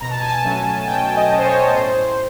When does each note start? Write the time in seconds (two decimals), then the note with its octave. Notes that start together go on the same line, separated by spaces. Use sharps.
0.01 B2 A#5
0.10 A5
0.19 G#5
0.28 A5
0.45 F#3 A3 C#4
0.87 B2 G5
1.16 D#5
1.30 F#3 A3 C#4
1.39 C5
1.45 C#5
1.74 A2 C5